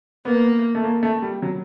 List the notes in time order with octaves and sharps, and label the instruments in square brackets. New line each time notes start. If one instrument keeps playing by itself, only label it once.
[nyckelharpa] A#3 [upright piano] B3
[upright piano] A3
A#3
A3
G3
F#3